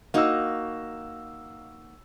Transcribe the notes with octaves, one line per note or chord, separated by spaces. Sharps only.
A#3 D#4 F#4 F5 E6